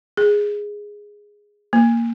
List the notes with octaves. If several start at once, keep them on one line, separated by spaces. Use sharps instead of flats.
G#4
A#3